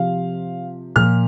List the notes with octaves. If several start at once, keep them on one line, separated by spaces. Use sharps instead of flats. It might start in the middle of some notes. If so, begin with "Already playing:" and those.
Already playing: C3 F3 F5
A#2 F3 F6